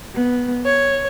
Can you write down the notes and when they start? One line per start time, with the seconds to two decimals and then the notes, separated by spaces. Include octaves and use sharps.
0.13 B3
0.64 C#5